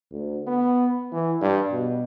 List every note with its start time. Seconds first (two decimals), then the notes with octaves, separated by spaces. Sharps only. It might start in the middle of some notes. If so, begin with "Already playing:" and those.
0.11 D2
0.47 B3
1.12 E3
1.41 G2
1.72 B2